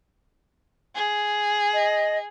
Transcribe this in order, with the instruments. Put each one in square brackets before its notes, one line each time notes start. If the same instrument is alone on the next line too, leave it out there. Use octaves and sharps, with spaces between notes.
[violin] G#4
[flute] D#5